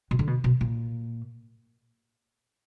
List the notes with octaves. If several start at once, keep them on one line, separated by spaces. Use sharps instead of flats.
B2
D3
B2
B2
A#2